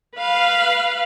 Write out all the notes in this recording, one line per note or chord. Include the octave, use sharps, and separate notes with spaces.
B4 F5